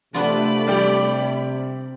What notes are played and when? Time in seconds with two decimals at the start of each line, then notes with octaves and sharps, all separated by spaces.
0.14 C3 A3 B3 D4 F4 D5 B5
0.68 G3 G4